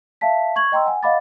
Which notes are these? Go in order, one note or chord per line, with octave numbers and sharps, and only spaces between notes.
E5 F5 A5 B6
C#6 G#6 F#7
D#5 G5 A#5 C6 E6
F#5 G#5
D#5 F5 F#5 B5 D6 A6